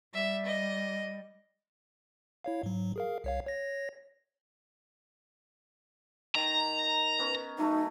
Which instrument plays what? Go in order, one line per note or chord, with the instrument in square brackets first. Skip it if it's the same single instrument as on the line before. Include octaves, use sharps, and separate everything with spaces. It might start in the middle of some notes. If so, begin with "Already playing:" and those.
[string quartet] G3 [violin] E5
[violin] D#5
[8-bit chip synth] E4 C#5 F5
G#2 F#3
G#4 A#4 F5
C2 C#5 F5
C#5 A#6
[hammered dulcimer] D#3 [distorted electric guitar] A#5
[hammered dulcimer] B3 C#4 A#4
[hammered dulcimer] F#3 A3 F#4 [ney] D#4